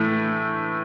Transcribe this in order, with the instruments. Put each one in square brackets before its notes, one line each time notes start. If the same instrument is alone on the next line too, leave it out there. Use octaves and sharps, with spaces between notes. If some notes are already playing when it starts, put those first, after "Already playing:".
Already playing: [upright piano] A2 E3 A3